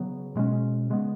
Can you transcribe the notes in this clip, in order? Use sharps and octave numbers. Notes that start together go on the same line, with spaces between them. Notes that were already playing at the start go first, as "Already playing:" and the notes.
Already playing: C#3 F#3 B3
B2 G#3 C#4
C#3 G#3 B3